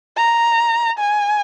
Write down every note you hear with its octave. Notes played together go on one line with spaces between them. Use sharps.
A#5
G#5